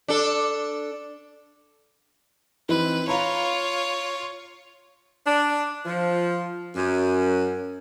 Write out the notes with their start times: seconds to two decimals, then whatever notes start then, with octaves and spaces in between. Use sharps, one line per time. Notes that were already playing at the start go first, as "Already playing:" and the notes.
0.08 D4 A4
2.69 E3 C4 D#4 B4
3.08 F4 C#5 F5 A#5 B5
5.25 D4
5.85 F3
6.75 F#2